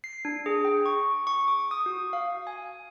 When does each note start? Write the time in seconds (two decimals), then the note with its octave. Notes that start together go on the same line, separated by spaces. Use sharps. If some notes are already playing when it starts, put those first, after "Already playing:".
0.04 C7
0.25 D4
0.46 G#4
0.65 G5
0.86 C#6
1.27 C#6
1.48 D6
1.71 D#6
1.86 F#4
2.13 F5
2.47 G#5